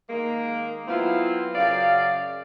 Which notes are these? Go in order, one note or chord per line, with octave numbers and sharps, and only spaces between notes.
D#3 G#3 A#3
F#3 B3 C4 E4 F4
F#2 C#3 D5 F5